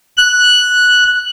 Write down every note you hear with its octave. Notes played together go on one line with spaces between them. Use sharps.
F#6